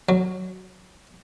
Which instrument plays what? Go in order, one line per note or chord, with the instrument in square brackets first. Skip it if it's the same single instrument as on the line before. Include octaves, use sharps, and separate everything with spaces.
[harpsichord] F#3